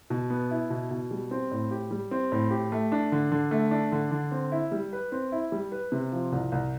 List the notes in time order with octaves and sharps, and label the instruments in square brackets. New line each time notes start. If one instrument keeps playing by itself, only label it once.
[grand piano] B2
B3
E4
B2
B2
G3
C4
A2
G4
G3
C4
A2
G4
A3
D4
D3
D3
A3
D4
D3
D3
C4
E4
G3
B4
C4
E4
G3
B4
C3
F3
C2
C2